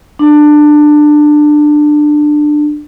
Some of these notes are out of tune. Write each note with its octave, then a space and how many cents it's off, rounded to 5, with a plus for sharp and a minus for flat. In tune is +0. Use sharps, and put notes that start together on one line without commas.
D4 +20